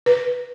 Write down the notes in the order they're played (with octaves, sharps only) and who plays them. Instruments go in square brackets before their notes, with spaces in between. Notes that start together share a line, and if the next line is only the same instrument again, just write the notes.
[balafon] B4